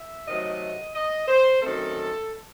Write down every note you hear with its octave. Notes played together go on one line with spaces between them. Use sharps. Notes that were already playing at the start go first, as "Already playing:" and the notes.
Already playing: E5
C3 D#3 F#3 A3 D#5
D#5
C5
F#2 D#3 A3 C4 A4